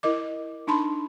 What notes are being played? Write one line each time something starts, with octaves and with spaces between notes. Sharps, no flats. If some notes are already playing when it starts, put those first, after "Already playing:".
E4 A#4 D#5 D6
D4 D#4 A5 B5 C6